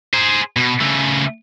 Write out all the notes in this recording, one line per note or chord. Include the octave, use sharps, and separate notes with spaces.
G#4 C5
B2
C#3 A3